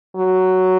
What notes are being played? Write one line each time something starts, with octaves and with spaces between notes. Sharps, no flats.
F#3